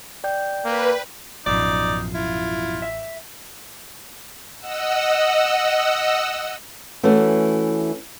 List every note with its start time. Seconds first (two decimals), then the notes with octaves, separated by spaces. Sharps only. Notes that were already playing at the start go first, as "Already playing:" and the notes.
0.24 D5 G5 G6
0.65 A#3 B4
1.46 A1 F#2 B2 F3 D#4 D5
2.15 E4 F4
2.82 E5
4.59 D#5 F#5 E6
7.03 E3 A3 C#4 F#4